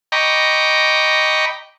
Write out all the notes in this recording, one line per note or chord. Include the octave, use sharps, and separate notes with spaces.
D#5 G5 A#5 B5 C#6 D6